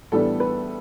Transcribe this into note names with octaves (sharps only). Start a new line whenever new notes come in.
A2 E3 G3 B3 D4 A4
B4